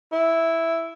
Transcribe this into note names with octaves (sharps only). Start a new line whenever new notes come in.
E4